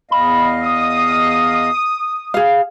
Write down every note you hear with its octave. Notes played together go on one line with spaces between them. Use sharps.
E2 D#5 F5 B5
D#6
G#4 F5